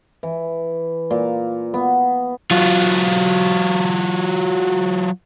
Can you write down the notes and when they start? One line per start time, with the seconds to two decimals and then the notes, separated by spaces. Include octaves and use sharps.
0.23 E3
1.11 A#2
1.74 B3
2.51 F#3 F4